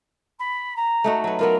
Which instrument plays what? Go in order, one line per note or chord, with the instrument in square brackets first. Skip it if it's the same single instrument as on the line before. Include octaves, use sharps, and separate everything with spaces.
[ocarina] B5
A#5
[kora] A3 D#4 F#4
F#3 B4
[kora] F#3 B3 F4 [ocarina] A#4